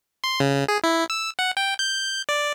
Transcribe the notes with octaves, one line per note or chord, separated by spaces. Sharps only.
C6
C#3
G#4
E4
E6
F#5
G5
G6
D5